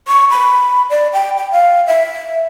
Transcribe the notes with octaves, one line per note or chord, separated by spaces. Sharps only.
C#6
B5
D5
G5
G5
F5
E5